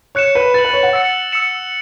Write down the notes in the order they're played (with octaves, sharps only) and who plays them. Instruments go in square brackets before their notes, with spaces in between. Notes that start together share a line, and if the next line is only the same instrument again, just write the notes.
[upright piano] C#5 [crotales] F#6 C#7 E7
[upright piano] B4
[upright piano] B4 [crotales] A6 F#7
[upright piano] B4
C#5
F#5
[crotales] E6 A6 C#7
E6 C#7 E7